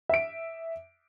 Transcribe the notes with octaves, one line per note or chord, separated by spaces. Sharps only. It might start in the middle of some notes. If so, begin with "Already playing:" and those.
E5 D7